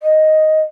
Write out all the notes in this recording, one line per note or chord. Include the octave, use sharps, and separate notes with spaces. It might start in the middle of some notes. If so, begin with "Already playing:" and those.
D#5